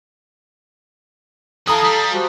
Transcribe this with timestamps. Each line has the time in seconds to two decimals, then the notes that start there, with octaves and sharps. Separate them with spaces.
1.67 E3 A4 F5 A5 A#5 D#6
1.85 G3
2.12 F#4 G4 C5